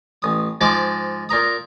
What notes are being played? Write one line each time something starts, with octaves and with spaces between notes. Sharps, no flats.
A1 D#6
G#2 F3 G#3 C5 G#5 D6
A#2 A#4 A#5 D#6